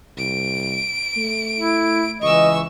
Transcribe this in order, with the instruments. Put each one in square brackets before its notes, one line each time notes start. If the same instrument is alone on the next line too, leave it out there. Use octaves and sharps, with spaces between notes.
[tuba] C2 [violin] D7
[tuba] A3
[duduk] E4
[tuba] C#2 [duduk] E3 [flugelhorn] D#5 [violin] C#6 E6